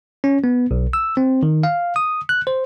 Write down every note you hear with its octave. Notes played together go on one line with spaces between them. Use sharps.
C#4
B3
B1
E6
C4
D#3
F5
D#6
F#6
C5